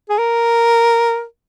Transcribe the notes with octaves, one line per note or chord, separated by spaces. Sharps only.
G#4
A#4